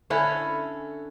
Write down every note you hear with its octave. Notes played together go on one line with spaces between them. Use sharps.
D3 C#4 E4 C#5